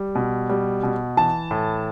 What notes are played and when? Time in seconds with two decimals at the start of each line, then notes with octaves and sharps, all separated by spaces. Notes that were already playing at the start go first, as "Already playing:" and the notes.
Already playing: G3
0.15 B2
0.50 G3
0.83 B2
1.17 E3 A5
1.51 A2